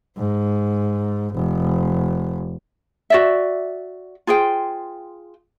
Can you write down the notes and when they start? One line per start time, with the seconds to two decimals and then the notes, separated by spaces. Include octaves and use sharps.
0.17 G#2
1.34 F1
3.10 F#4 D5 E5
4.27 F4 G#4 C5 G5